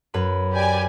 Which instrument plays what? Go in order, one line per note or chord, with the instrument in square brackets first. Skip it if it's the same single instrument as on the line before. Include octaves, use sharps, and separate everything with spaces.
[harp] F#2 B4 B5
[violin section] G4 D5 G#5